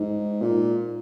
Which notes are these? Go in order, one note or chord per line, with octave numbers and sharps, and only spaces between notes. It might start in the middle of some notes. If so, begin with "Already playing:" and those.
Already playing: G#2
A#2